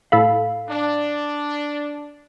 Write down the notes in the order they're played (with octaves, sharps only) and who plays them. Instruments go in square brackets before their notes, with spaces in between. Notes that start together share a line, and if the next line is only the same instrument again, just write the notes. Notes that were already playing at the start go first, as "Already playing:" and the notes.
[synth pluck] A2 A4 B5 [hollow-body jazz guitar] F5
[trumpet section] D4